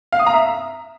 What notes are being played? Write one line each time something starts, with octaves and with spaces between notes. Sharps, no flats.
F5
D#6
A#5
E5